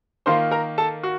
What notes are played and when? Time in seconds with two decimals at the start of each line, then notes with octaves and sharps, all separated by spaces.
0.26 D#3 A#3 F4 C5 C6
0.51 A#4 A#5
0.78 A4 A5
1.03 F#4